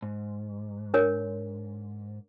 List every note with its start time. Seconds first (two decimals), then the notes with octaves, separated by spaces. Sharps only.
0.02 G#2
0.94 D4 A#4 C#5